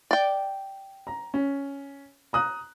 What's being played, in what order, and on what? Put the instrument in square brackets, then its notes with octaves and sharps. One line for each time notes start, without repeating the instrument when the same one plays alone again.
[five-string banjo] D5 G5
[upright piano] A#5
C#4
A#5 D#6 F#6